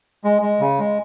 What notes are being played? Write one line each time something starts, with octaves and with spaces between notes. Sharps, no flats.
G#3
G#3
C#3
G#3